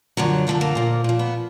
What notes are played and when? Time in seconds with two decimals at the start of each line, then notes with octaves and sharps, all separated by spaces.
0.17 F#2 D3 F3 F#3
0.47 F#2 D3 F3 F#3
0.61 A#3
0.75 A#2 F3
1.04 A#2 F3
1.19 B3